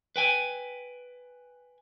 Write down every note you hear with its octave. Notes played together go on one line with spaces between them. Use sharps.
B4 G5 G#5